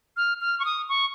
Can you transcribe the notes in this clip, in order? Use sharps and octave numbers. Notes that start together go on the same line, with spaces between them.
F6
F6
C#6
D#6
C#6